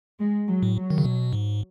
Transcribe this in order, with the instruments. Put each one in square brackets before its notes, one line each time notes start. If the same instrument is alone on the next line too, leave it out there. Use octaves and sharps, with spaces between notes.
[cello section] G#3
F#3
[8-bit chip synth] A2
[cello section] F#3
[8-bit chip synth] D#3
C#3
B2
G#2